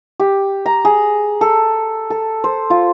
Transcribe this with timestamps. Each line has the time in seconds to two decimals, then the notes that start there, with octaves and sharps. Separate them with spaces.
0.20 G4
0.66 A#5
0.85 G#4
1.41 A4
2.10 A4
2.44 C5
2.70 F4